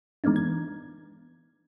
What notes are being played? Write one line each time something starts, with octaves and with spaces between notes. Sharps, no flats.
E3 G#3 B3 D4 D#4
G#6